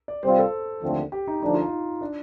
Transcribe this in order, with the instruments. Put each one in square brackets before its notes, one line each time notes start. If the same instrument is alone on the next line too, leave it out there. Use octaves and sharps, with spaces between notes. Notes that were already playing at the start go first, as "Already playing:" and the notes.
[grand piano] D5
[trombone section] C3 G3 C4 F4 [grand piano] C5
[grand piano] A4
[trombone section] D#2 D3 F3 A3 C4
[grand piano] G4
D#4
[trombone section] D3 F3 A3 D4 [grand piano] D#4
[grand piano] F4
D#4
D4